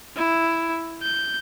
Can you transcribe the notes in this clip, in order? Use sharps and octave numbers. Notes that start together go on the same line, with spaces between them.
E4
G6